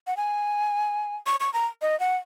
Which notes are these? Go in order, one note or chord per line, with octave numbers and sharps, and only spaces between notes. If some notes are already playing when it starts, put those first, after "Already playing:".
F#5
G#5
C#6
C#6
A#5
D#5
F#5